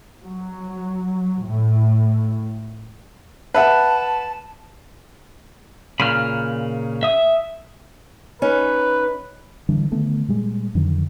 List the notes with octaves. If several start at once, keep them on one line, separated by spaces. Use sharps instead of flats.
F#3
A2
B4 E5 F#5 A5
A#2 C#3 B5 F6
E5 D#6
C#4 D#4 B4
D3 E3 G3 D4
D3 D#3 A3 B3
A#2 G3 G#3
F2 D3 D#3 F#3